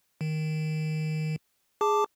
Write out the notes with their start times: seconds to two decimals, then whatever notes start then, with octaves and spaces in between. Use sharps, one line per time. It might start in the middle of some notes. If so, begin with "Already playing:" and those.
0.21 D#3
1.81 G#4 A5 D6